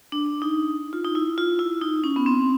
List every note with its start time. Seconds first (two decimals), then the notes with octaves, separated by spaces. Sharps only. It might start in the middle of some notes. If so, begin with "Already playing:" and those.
0.12 D4
0.42 D#4
0.93 F4
1.05 D#4
1.15 E4
1.38 F4
1.59 E4
1.82 D#4
2.04 C#4
2.16 B3
2.26 C4